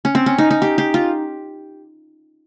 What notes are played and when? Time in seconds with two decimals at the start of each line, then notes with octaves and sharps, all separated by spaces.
0.05 C#4
0.15 C4
0.26 C#4
0.38 D#4
0.50 D#4
0.62 G4
0.78 G4
0.94 F4